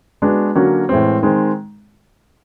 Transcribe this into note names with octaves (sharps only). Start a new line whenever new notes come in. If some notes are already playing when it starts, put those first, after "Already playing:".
G#3 B3 D4 F#4
D3 F#3 A#3 C#4 F#4
A2 E3 G#3 C4
D#3 G#3 C4